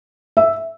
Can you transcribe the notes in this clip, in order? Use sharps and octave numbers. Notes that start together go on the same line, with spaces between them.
E5